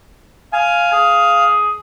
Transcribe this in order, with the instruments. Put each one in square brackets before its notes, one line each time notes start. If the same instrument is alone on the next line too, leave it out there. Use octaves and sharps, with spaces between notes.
[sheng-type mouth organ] F5 [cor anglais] G#5
[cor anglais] G#4